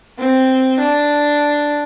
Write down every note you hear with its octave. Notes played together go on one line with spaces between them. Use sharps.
C4
D4